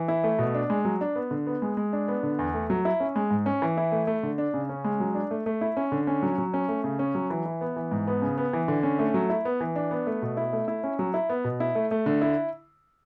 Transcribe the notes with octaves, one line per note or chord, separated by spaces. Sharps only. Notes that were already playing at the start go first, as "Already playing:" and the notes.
Already playing: E3
E4
A3
B2
D4
G#3
F#3
D4
B3
D3
B3
G#3
G#3
D4
B3
D3
E2
A3
F#3
E4
C#4
G#3
G#2
C#4
E3
E4
A3
A3
D3
D4
C#3
C#4
G#3
F#3
D4
A3
A3
E4
C#4
D3
C#4
F#3
F#3
C#4
A3
C#3
C#4
F#3
E3
E4
B3
E3
G#2
B3
C#3
B3
E3
D3
C#4
A3
F#3
E4
B3
E3
D4
B3
A3
B2
E4
A3
E4
C#4
F#3
E4
B3
B2
E4
A3
A3
D3
E4